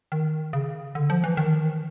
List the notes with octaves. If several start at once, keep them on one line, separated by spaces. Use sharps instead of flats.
D#3
C#3
D3
F3
E3
D#3